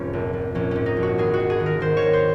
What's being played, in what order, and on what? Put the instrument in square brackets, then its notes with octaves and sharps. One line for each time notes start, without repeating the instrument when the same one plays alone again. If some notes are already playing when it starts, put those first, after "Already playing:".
Already playing: [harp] F1 F2 G#2 C#4 G#4
A#1
A#1
A#1 C#4
G#2 C#4
D#4
A#1
F#4
D#2 G#4
F#4
D#2
G#4
D#3
A#4
D#3 C5
C#5
D#2
C5